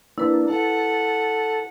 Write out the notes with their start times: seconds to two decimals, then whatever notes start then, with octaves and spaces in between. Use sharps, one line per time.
0.18 A#3 D4 E4 B4
0.50 A4 F#5